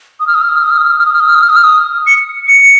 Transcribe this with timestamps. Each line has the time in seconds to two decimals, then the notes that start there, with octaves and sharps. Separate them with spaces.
0.20 D#6
0.27 F6
0.35 D#6
0.42 F6
0.49 D#6
0.56 F6
0.63 D#6
0.70 F6
0.78 D#6
0.85 F6
0.92 D#6
0.99 F6
1.06 D#6
1.13 F6
1.20 D#6
1.28 F6
1.35 D#6
1.42 F6
1.49 D#6
1.56 F6
1.64 D#6
2.07 C#7
2.48 C#7